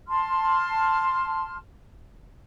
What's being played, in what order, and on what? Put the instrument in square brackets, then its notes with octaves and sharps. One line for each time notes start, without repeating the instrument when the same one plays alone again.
[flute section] A5 C6 F6